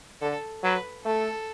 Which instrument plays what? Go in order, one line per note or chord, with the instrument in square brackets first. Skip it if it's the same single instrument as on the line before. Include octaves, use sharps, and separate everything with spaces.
[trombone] D3 [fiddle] A4
[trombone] F#3 [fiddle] B4
[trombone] A3 [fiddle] A4